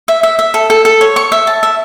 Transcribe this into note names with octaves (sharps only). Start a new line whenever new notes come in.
E5
E5
E5
A4
A4
A4
C#5
C#6
E5
A5
E5